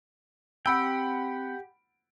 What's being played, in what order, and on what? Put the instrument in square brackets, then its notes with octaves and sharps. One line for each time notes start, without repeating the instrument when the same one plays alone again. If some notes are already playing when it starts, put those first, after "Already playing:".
[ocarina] C4 [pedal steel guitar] G4 G5 [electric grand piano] F#5 B5 D7 [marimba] E6